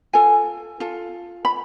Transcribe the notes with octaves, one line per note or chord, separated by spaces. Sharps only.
F4 A4 G#5
F4 A4
B5